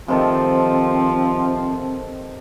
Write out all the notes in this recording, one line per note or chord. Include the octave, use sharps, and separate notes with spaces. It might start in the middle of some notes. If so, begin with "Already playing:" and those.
C3 D#3 F3 C4 A4